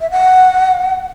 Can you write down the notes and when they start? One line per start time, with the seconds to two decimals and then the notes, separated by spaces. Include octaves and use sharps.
0.01 E5
0.11 F#5